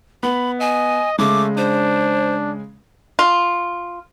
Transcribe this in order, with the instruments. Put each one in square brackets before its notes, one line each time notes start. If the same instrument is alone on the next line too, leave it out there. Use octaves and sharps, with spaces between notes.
[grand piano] B3 [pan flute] B5
[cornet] D#5 [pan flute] G#5
[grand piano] C#3 G#3 [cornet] A3 [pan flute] D6
[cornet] D4 [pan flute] C5
[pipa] F4